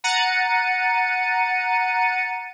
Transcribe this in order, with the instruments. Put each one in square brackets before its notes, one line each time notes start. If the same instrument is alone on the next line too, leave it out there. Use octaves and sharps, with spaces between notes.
[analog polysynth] F#5 A#5 A6 C#7 D#7